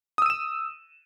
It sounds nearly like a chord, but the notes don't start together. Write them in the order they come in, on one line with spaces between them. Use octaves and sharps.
D#6 E6 D#7 E7